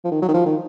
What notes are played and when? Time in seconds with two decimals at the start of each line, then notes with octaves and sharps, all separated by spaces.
0.05 F3
0.11 D#3
0.22 F#3
0.28 D#3
0.34 F3
0.46 D#3